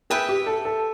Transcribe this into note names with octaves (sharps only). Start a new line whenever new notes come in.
G#4 B4 E5 G5
G4
A4
A4